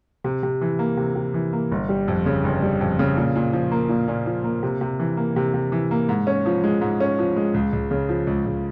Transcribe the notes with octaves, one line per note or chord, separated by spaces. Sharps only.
C3
C3
E3
A#3
C3
C3
E3
A#3
G1
G3
F2
C#3
G1
G3
F2
C#3
A#2
A#2
F3
A#3
A#2
A#2
F3
A#3
C3
C3
E3
A#3
C3
C3
E3
A#3
G#2
C#4
F3
G#3
G#2
C#4
F3
G#3
C#2
C#2
C#3
F3
C#2
C#2